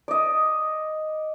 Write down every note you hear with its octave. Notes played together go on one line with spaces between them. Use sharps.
D5 D#5